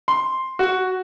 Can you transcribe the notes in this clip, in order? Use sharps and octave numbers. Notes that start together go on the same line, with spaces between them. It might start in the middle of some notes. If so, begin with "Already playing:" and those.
C6
F#4